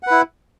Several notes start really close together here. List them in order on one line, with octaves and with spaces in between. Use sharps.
F#5 B4 E4